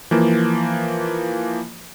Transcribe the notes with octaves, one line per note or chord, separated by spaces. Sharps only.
E3 F3 A#3